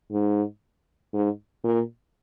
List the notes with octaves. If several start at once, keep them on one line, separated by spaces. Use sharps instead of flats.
G#2
G#2
A#2